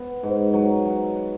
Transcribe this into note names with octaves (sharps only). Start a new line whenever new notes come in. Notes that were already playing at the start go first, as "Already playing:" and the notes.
Already playing: B3
G#2
F#3
F#3